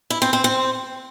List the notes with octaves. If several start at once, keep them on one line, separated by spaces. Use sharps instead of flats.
E4
C4
C4
C4